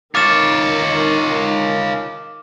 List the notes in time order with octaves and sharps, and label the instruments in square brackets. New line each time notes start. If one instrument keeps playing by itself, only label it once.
[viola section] D#3 [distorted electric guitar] F4 C#5 [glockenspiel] D6 F6 E7 [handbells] A6